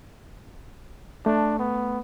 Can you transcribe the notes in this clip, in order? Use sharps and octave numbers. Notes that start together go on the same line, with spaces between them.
A3 D4
B3